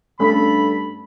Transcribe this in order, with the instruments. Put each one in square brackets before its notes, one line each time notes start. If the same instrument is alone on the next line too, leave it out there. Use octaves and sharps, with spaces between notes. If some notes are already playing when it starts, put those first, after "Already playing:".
[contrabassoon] G2 [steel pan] A3 C#4 [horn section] A4 B5